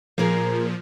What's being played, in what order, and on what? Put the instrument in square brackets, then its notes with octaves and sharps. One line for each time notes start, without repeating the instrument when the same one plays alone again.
[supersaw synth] A#2 F3 [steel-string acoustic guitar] A#3 G#4 A#4